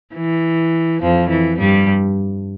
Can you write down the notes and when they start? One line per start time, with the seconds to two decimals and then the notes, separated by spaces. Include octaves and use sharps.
0.15 E3
1.02 F2 F3
1.29 E3
1.59 G2 G3